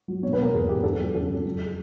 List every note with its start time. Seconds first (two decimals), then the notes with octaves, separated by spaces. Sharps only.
0.08 F#3
0.23 B2 C#5
0.33 B4
0.38 B2 A#4
0.54 E2 G#4
0.69 E2 G4
0.84 F2 A4
1.00 F#3
1.14 C#3 A4
1.29 F2
1.45 F#3
1.65 G#4